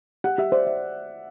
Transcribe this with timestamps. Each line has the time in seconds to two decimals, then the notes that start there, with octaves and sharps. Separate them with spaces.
0.24 G4 F#5
0.38 G4 E5
0.52 C5 D5
0.67 E5